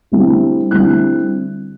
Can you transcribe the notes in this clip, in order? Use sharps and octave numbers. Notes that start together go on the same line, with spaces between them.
D3 G3 C4 E4
D3 G3 C4 E4 F#6